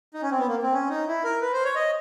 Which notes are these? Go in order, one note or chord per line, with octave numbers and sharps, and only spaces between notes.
D#4
C#4
C4
B3
A#3
C4
C#4
D#4
E4
A#4
B4
C5
C#5
D#5